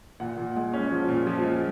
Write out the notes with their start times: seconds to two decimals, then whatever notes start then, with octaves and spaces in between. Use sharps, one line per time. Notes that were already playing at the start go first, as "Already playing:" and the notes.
0.20 A#2 F#5
0.37 A#2
0.56 G#3
0.73 C#4
0.91 F3
1.09 A#2
1.27 F3
1.44 G#3